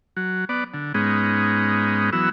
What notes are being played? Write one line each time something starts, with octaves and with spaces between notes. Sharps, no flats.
F#3
B3 D5
D3
G#2 G#3 B3 C#4 D#4
E3 F#3 B3 E6